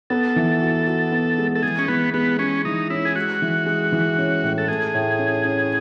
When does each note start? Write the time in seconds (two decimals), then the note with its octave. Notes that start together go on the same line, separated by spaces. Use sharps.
0.10 B3 A4
0.36 E3
0.61 F#4
0.87 F#4
1.12 B3
1.38 G#3
1.55 A4
1.63 E3 G#4
1.79 C#4
1.88 E3 B3
2.14 G#3 B3
2.39 G#3 C#4
2.65 E3 D#4
2.90 C#4 E4
3.05 G#4
3.15 G#3 F#4
3.42 E3
3.66 G#3
3.92 E3
4.18 C#4
4.43 A2
4.58 A4
4.68 A3 G#4
4.94 A2
5.19 C#4
5.44 C#4